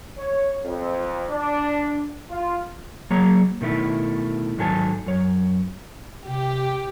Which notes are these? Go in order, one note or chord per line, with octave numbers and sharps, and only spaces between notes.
C#5
F2
D4
F4
F#3 A#3 G#4 C#5 A#5
B2 D#3 A3 E4
G#2 D#3 F#3 A4 G#5 A5
F#2 C#5
C3 G4